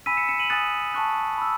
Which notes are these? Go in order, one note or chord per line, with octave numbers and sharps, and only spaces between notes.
G#5 B5 E6 B6 D#7
C#7 E7
C#7 E7
D#7 F#7
G#5 D#6 F#6 A6 C#7
A5 C#6 F#6
B5 E6